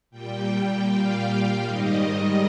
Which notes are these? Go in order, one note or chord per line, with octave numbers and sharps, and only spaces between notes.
A#2 G3 G5
F5
F5
G#2 D#3 G3 D#5